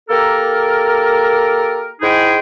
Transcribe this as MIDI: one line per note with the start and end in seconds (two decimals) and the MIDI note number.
0.09 1.91 58
0.09 1.91 67
0.09 1.91 69
0.09 1.91 70
2.01 2.37 44
2.01 2.37 56
2.01 2.37 63
2.01 2.37 64
2.01 2.37 68
2.01 2.37 79